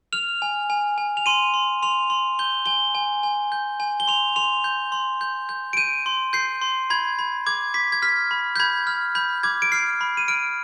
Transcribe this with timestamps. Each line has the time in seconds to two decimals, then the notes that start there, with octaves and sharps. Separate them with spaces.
0.13 F6 F7
0.42 G#5
0.70 G#5
0.98 G#5
1.17 F7
1.26 C6 D#7
1.54 C6
1.83 C6 F7
2.10 C6
2.39 G6 G7
2.66 G#5 G7
2.95 G#5
3.23 G#5
3.52 G6
3.80 G#5
4.00 G7
4.08 C6 F7
4.36 C6 F7
4.64 G6
4.92 C6
5.21 G6
5.49 G6
5.73 D7
5.77 G6 D#7
6.06 C6
6.33 G6 C7
6.62 C6
6.90 B5 G#6
7.19 B5
7.46 D6 G#6
7.74 D6 B6
7.92 G#6
8.02 F6 B6
8.31 B5
8.56 G6
8.60 B5 G#6
8.87 F6
9.15 B5 G6
9.43 D6 G#6
9.62 D7
9.72 F6 C7
10.01 B5
10.17 D#7
10.28 F6 D7